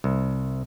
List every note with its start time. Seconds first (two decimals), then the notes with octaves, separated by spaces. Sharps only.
0.04 C2